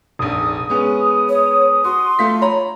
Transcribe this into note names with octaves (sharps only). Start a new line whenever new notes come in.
F1 A#1 D#6
G#3 B3 C#4
C#5
F#4 C6
A3 F4 B6
C#5 A#5 B5